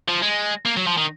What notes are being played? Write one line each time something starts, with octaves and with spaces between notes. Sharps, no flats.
F3
G#3
A#3
F#3
F3
D#3